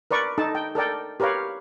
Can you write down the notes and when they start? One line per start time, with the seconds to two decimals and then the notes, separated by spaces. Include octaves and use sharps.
0.11 A#4 B4 D5 C#6
0.38 D#4 A4 A5
0.55 G5
0.75 A4 A#4 D5 G5
1.20 G4 A#4 B4 C#5 F5